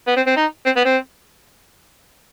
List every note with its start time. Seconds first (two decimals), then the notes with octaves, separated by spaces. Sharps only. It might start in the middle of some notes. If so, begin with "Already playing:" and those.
0.07 B3
0.16 C4
0.27 C4
0.37 D#4
0.65 C4
0.76 B3
0.85 C4